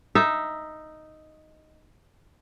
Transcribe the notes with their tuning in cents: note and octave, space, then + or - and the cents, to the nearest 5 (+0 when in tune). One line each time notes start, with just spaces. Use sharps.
D#4 +0 E5 +0